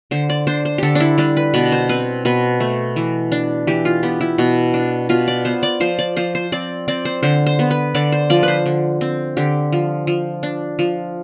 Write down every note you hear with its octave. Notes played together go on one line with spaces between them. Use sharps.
D3 C5
D5
D4 C5
C5
D3 G4 A4
D4 E4
G3 D4
B4
B2 D5
C5
C4 B4
B2 B4
A3
E3
D4
E3 G4
F4
B3 G4
E4
B2
D4
B2 F4
D5
B3 C5
D5
F3 C5
D5
F3 C5
C5
C4 D5
C4 D5
C5
D3 C5
C5
B3
B4
D3 D5
C5
F3 D5
B4 C5
D3
C4
D3 G4
F3
F3
D4
F3